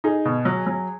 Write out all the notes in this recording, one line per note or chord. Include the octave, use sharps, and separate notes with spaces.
D#4 G#4
B2
F#3
F#3